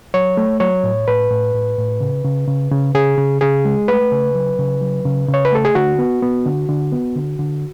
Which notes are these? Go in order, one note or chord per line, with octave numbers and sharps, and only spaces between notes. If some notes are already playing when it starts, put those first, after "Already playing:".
F#3 C#5
A3
F#3 C#5
A2
A2 B4
A2
A2
A2
C#3
C#3
C#3
C#3
C#3 G#4
C#3
C#3 G#4
G#3
A3 B4
C#3
F#3
C#3
F#3
C#3
C#3
C#5
B4
A3 A4
G#4
D3 F#4
B3
B3
D3
D3
B3
D3
D3